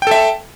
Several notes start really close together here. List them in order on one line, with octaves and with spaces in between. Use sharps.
G5 A4 E5